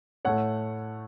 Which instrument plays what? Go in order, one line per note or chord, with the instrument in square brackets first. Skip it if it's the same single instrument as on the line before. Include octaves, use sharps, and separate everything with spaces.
[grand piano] A2 A3 C#5 F#5